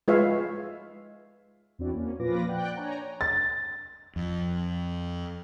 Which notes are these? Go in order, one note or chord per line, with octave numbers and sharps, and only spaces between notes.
G#3 F4 B4 C#5 E5 F5
E2 C4 D4 E4 F#4 D5
A#3 C#4
A#2 F3 F4 B4 D6 A#6
D5 F#5 G5 F#6
D4 C#5 G#5 A#5
A6
F2